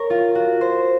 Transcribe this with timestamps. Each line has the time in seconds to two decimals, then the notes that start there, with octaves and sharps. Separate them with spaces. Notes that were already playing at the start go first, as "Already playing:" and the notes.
Already playing: A#4 C#5
0.10 F4
0.35 F#4
0.61 C5